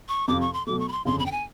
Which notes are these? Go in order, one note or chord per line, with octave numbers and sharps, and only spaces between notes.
C#6
F2 C3 F3 D6
C#6
C6
B2 F#3 A3 D6
C#6
B5
C6
G1 F2 C#3 C6
B5
G5
G#5